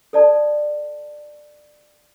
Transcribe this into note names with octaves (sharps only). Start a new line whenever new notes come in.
A4 D5 A5